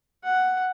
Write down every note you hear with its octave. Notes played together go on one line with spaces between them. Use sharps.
F#5